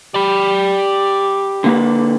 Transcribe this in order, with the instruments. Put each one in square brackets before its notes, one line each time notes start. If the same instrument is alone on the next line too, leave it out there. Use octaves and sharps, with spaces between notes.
[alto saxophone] G4 [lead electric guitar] D5 B5
[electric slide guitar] D3 A#3 B4